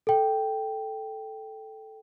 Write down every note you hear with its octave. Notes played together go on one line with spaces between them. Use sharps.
A4 G5